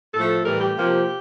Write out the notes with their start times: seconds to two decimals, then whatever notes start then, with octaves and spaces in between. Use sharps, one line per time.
0.14 A2 F3 A3 A4
0.45 A2 E3 G3 A#4
0.60 G4
0.76 C3 F3 A#3